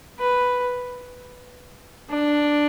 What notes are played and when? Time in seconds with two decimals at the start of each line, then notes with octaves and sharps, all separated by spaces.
0.19 B4
2.10 D4